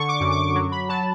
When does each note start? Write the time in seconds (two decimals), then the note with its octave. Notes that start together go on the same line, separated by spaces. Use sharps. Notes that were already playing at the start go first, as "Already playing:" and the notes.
Already playing: D3 C#6
0.09 D6
0.20 F#2
0.31 D6
0.55 F#3
0.72 B5
0.89 F#3 A5